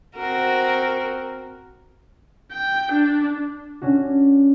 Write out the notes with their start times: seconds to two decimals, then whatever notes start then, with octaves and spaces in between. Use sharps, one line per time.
0.16 C4 F#4 A#4
2.51 G5
2.92 D4
3.82 C#4 D4 F#4